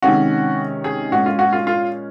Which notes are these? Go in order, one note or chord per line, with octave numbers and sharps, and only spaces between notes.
C3 D#3 G#3 C#4 F#4
G#4
A#2 G#3 C#4 F#4
F4
F#4
F4
F4